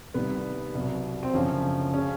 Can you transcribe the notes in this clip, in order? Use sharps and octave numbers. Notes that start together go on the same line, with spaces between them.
C2 C3 D#3 G3 B3
C2 B2 F#3
C4
F#1 F#2 D3 F3 C#4
C#3 C#4